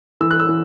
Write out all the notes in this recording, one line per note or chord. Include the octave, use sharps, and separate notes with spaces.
E3 E6
F#6
E6
E3